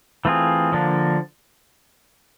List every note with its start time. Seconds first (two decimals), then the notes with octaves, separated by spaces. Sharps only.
0.25 E3 A3 C4 F4 G#4
0.72 D3 F3 A#3 D4